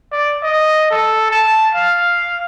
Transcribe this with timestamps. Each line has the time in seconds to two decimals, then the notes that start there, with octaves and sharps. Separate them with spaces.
0.12 D5
0.43 D#5
0.91 A4
1.31 A5
1.75 F5